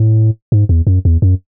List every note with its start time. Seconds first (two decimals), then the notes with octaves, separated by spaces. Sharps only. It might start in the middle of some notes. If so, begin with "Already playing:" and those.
Already playing: A2
0.52 G#2
0.69 E2
0.87 F#2
1.05 E2
1.22 F#2